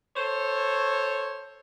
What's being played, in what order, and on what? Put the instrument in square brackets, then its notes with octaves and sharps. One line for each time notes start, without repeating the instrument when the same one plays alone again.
[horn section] A4 C5 C#5